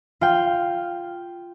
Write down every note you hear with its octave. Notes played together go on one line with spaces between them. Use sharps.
F4 F5 G5